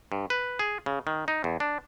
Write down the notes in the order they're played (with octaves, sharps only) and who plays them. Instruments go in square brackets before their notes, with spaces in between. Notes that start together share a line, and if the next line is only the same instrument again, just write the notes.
[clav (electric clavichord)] G2
B4
G#4
C#3
D#3
D#4
E2
D4